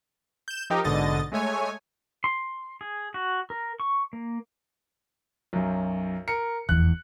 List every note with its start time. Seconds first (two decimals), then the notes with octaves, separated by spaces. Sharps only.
0.48 G6 E7
0.70 F3 D#4 G4 A#4
0.84 A#1 G#2 B2 D3 D#5 A6
1.32 G#3 A3 C#5 G#5
2.24 C6
2.81 G#4
3.14 F#4
3.50 A#4
3.80 C#6
4.13 A#3
5.53 B1 F#2
6.28 A#4 C#7
6.69 F1 E2 F#6